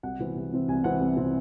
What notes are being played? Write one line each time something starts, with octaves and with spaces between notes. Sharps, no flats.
C2 F#5
C3 E3 C4
C2
C3 E3 C4
C2 G#5
C3 E3 C4 F#5
C2
C3 E3 C4